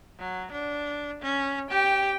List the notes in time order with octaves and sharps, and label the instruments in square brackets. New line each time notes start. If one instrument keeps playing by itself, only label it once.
[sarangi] F#3
D4
C#4
[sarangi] G4 [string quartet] G5